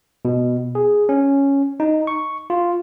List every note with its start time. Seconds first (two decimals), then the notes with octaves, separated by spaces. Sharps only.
0.25 B2
0.75 G#4
1.09 C#4
1.80 D#4
2.07 C#6
2.50 F4